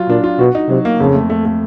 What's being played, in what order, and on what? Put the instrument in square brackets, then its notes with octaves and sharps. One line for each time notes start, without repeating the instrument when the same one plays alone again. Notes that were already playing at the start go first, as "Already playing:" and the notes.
Already playing: [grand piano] F#3 F4
[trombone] A#2 [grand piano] D4
[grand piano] F4
[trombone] B2 [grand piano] F#4
[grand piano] D#4
[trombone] C3 [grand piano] F#3
[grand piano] A#3
[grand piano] F2 [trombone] C#3
[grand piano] A3
A3
A3